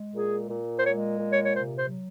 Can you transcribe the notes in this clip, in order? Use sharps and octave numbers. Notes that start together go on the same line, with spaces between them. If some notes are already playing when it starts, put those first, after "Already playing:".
Already playing: G#3
A#2 G#4
A#2
C5
G#3 C#5
A#2
C#5
C#5
C3 C5
C5
F#3